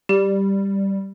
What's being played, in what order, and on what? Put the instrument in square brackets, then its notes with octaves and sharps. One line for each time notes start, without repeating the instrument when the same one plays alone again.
[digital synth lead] G3 [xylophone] G4